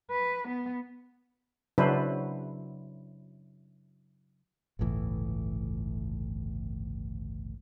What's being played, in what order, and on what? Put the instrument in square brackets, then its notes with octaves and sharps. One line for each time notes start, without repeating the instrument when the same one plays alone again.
[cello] B4
B3
[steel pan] C#3 F#3 D4 E4 B4 C5
[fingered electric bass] G1 C#2 A2 E3